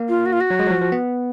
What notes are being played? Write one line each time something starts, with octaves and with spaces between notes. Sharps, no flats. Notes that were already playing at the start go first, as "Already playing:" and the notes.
Already playing: A#3
F4
F#4
F4
F#4
F#3
G#3
F#3
F3
F3
B3